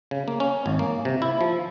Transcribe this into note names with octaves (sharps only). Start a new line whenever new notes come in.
C#3
A#3
C#4
G#1
A#3
C3
E4
F3